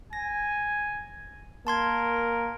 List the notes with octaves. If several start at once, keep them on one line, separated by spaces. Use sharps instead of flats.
G#5 A#6
A#3 A#4 A5 C6 G#6